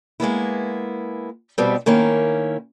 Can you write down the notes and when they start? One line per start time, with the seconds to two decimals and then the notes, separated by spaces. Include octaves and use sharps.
0.20 G#3 A#3 B3 E4
1.58 F2 B2 G3 B3 C4
1.86 D#3 A#3 C#4 E4